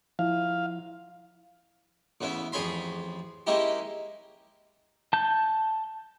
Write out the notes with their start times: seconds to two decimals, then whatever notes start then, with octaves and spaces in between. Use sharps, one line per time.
0.19 F3 E4 F5
2.21 A1 C#3 B3 C#4 E4
2.52 A1 F2 G#4 C#5 B5 C6
3.47 G#3 A#3 C#4 D#4 E4 G4
5.13 A5 G6